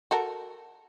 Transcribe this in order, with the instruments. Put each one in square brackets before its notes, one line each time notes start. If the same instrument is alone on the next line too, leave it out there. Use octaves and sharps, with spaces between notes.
[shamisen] F#4 A4 A#4